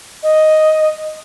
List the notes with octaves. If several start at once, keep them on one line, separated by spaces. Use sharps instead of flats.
D#5